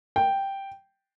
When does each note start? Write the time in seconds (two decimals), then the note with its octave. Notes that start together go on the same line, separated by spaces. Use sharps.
0.16 G5